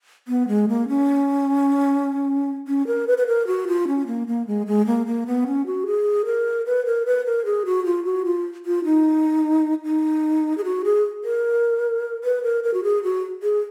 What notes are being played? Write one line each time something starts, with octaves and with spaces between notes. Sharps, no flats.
B3
G#3
A#3
C#4
C#4
A#4
B4
B4
A#4
F#4
F4
C#4
A#3
A#3
G#3
G#3
A#3
A#3
B3
C#4
F#4
G#4
A#4
B4
A#4
B4
A#4
G#4
F#4
F4
F#4
F4
F4
D#4
D#4
G#4
F#4
G#4
A#4
B4
A#4
A#4
F#4
G#4
F#4
G#4